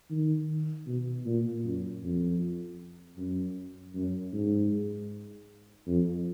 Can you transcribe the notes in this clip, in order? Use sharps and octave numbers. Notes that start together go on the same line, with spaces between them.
D#3
B2
A#2
F#2
F2
F#2
F#2
G#2
F2